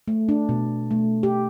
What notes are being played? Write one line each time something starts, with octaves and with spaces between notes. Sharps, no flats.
A3
D4
B2
A3
G4